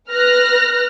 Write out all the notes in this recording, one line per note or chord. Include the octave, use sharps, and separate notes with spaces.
B4 F6 F#6 A#6